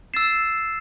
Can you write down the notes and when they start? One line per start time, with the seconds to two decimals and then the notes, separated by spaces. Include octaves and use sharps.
0.14 E6 A6 C7 E7